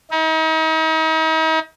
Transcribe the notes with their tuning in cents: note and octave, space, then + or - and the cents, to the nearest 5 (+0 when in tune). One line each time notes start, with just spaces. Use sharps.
D#4 +40